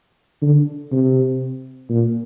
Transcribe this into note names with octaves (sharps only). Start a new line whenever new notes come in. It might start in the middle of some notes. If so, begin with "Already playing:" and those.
D3
C3
A#2